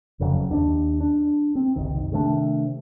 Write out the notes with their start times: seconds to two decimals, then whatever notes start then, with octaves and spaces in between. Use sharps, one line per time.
0.19 F1 F2 C#3 F#3
0.51 D#2 D4
1.01 D4
1.55 C4
1.76 F#1 C2 D#3
2.12 C3 D#3 A3 D4